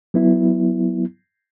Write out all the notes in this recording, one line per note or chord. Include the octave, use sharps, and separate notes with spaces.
F#3 B3 E4